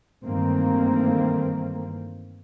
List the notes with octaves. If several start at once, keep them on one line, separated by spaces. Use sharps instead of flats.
G2 D#3 E3 A3 A#3 C4